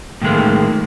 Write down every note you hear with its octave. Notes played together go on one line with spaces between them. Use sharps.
A2 D#3 G#3 A#3